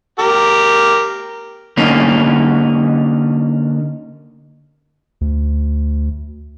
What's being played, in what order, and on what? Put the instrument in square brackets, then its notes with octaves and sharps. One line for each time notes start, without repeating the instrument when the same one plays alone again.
[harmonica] G4 A#4
[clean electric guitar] D3 A#3 C#4 D#4
[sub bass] D2